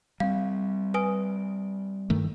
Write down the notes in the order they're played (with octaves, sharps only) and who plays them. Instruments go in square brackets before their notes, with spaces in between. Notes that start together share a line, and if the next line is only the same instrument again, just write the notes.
[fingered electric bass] G3 C4 [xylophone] F5
[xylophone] B4 G#5 D#6
[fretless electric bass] G2 D#3 A3